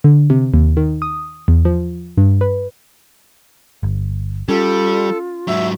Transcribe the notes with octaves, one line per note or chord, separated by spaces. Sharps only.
D3
C3
D#2
D#3
D#6
E2
F3
G2
B4
G1
G3 C#4 F4 A4
G#2 F#3 E5